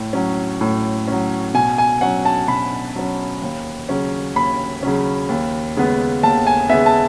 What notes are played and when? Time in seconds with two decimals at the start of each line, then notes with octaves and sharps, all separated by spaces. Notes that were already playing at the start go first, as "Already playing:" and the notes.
Already playing: A2
0.13 F#3 C#4
0.61 A2
1.08 F#3 C#4
1.54 B2 G#5
1.78 G#5
2.01 F#3 C#4 F#5
2.25 A5
2.48 B2 B5
2.96 F#3 C#4
3.42 D#2
3.89 C#3 F#3 C#4
4.35 D#2 B5
4.83 C#3 F#3 C#4
5.29 D#2
5.76 C#3 G#3 B3
6.23 D#2 A5
6.47 G#5
6.69 C#3 G#3 B3 E5
6.86 A5